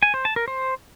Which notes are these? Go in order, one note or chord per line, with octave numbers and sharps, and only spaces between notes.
G#5
C5
A5
A#4
C5